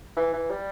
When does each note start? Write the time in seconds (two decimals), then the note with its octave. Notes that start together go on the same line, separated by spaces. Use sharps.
0.17 E3
0.33 E3
0.50 G3